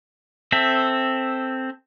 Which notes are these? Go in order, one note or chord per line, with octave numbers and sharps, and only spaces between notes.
C4 A4 E5